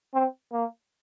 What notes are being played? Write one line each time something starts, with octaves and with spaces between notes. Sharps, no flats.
C4
A#3